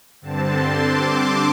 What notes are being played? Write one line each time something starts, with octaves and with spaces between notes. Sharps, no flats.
G2 D3 C4 A5
C6
D6
D6